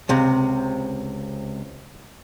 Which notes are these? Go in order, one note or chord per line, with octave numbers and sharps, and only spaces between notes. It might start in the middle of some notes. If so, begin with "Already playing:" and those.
C#2 C3